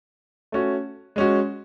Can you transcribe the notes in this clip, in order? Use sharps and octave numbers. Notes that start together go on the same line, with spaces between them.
A3 C#4 F#4
G#3 C#4 F#4